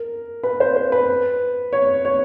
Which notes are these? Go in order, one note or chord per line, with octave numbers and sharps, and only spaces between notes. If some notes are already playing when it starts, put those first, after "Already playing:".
Already playing: A#4
B4
C5
C5
B4
C#5
C#5